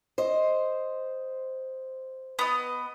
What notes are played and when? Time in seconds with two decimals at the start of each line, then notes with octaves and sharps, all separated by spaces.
0.18 C5 D#5
2.39 B3 D#5